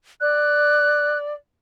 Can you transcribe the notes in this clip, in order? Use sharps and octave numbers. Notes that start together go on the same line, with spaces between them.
D5 F#6